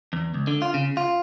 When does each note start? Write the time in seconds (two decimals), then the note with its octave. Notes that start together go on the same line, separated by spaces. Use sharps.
0.13 E2
0.34 C#2
0.47 D3
0.62 F4
0.74 C#3
0.97 F4